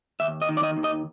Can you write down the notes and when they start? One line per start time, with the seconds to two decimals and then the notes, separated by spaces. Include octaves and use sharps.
0.20 D#2 E5
0.42 D#5
0.49 D#3
0.57 D5
0.63 D#5
0.77 D#2
0.84 D#5